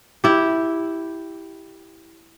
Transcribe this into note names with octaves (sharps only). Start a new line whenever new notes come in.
E4 G4